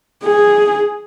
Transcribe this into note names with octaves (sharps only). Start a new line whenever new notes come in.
G#4